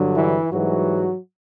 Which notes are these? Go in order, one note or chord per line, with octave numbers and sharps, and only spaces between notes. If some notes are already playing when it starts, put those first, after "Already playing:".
Already playing: G2 D3 F#3
E3 E4
G#2 E3 F#3 G3 F#4